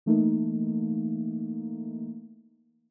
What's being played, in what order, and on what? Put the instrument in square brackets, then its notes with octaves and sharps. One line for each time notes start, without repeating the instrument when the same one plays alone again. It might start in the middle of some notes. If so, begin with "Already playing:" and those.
[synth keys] E3 A3 A#3 D#4